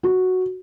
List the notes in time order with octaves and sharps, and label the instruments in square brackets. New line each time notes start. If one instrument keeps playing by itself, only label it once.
[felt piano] F#4